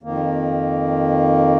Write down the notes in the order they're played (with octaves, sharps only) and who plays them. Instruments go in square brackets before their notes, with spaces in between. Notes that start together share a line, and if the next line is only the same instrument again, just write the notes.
[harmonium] F2 D#3 A#3